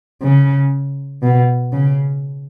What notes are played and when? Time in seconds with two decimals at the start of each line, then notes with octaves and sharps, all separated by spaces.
0.22 C#3
1.22 B2
1.72 C#3